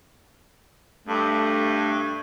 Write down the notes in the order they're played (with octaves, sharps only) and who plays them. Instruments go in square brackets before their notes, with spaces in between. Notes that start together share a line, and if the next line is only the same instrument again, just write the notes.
[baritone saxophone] G2 [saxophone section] A3